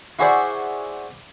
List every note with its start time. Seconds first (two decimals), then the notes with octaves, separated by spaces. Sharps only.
0.19 E4 F#4 G#4 C5 D5 E5